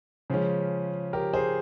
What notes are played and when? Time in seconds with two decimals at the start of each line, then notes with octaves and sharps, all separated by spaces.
0.30 C#3 F3 G#3 C#4
1.13 G4 A#4
1.34 G#4 C5